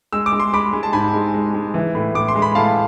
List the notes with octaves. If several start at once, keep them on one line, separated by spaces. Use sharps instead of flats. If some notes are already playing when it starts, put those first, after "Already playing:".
G#3 E6
D6
G#3
C6
G#3 B5 D6
G#3
A5
G#2 G#5 B5
G#3
G#3
G#3
E3
A2
A2 D6
C6
G#3
B5
A2 F5 A5